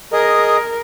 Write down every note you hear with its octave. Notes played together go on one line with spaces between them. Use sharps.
G#4 A#4 D#5